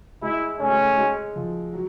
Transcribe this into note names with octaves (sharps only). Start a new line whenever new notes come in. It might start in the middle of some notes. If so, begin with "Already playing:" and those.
G#3 E4
A3 C#4
G#3
A3
G#3
F3
F#3